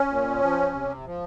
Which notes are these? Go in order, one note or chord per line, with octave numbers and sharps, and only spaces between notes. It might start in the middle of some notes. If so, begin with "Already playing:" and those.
Already playing: C#4
A#2
F3
C3
F3